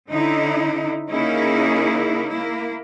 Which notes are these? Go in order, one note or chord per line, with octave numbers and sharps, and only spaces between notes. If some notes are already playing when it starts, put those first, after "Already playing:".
D3 C#4 D#4 E4
C#3 A#3 C#4 D#4 E4 G#4
A#3 E4